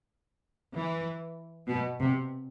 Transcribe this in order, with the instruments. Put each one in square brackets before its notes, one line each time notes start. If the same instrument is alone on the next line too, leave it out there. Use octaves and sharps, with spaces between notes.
[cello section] E3
B2
C3